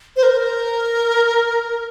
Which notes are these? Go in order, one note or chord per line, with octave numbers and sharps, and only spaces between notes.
C5
A#4